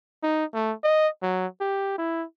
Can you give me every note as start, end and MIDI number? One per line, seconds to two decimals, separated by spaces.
0.23 0.45 63
0.54 0.73 57
0.84 1.08 75
1.23 1.47 54
1.61 1.95 67
1.98 2.25 64